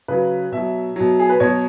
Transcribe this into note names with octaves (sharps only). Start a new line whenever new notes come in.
C#3 F#3 B4
B2 F#3 E5
B2 F#3
G#4
B4
B2 F#3 C#5